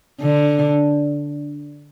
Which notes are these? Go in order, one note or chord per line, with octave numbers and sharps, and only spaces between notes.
D3